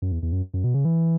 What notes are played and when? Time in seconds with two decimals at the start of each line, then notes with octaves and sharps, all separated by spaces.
0.02 F#2
0.12 E2
0.23 E2
0.32 F#2
0.54 F#2
0.64 B2
0.74 C#3
0.85 E3